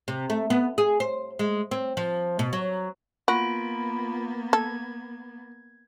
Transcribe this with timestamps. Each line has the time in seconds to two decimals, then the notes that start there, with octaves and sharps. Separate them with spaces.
0.08 C3
0.30 A3
0.50 B3
0.78 G#4
1.00 C5
1.39 G#3
1.71 C4
1.97 F3
2.39 B2
2.53 F#3
3.28 A#3 B3 F4 F#4 B5 D7
4.53 A4 G#6